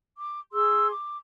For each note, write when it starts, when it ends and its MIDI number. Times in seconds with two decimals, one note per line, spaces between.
0.17 0.40 86
0.52 0.90 68
0.52 0.90 84
0.52 0.90 88
0.91 1.16 86